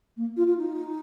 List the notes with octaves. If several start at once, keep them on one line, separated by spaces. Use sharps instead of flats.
A#3
F4
F4
D#4